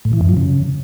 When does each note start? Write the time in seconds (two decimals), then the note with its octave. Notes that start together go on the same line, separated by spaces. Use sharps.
0.05 A2
0.13 E3
0.21 F#2
0.29 F3
0.37 C#3